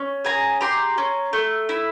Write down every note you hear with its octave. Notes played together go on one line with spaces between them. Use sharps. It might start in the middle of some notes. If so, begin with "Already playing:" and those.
Already playing: C#4
G#4 G#5 A#5
G4 A#5 C6
C#4
A3
E4